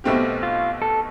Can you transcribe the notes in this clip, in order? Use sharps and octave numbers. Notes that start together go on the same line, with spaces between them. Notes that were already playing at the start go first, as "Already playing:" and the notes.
B1 B2 A3 C4 G4
F4
A4